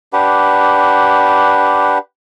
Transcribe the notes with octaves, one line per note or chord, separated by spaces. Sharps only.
D4 G4 B4 F#5